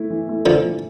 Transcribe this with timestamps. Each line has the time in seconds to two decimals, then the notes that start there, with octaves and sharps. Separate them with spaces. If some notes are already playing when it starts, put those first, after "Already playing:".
Already playing: A3 E4
0.10 E3
0.28 A3 E4
0.46 D3 E3 F3
0.64 A3 E4